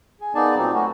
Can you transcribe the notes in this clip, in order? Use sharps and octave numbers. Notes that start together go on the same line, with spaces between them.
G#4
A#3 B3 D#4 G#4 D5 A5
A#2 F#3 C4 D#4
A3 B3 C#4 F#4